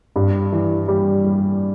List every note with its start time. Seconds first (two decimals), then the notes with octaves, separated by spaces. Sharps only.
0.16 G2
0.52 E3
0.88 G3
1.25 G3